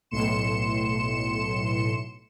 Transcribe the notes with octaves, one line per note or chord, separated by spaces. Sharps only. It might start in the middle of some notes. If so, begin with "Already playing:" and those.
B1 A2 C6 C#7 E7